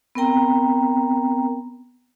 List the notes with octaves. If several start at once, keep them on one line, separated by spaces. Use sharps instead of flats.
B3 C4 A#4 G5 A#5